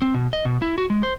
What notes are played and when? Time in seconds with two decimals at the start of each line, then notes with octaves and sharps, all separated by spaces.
0.02 C4
0.14 B2
0.33 D#5
0.45 B2
0.62 E4
0.78 F#4
0.90 G#3
1.03 C5